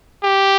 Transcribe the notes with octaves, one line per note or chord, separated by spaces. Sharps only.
G4